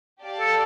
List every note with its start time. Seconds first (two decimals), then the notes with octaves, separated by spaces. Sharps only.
0.22 G4 D5 F5 A5
0.40 A4